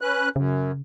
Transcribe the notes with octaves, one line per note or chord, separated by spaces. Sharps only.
C#4 B4 F#6
F#2 C#3